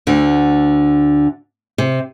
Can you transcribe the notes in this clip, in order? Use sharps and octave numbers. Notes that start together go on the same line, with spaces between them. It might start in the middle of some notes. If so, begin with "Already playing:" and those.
D2 D3
C3